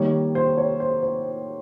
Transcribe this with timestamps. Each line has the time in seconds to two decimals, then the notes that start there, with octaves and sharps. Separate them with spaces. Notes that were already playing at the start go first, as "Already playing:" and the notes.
Already playing: D#3 G3 A#3 C#5
0.35 C5
0.57 C#5
0.80 C5
1.03 C5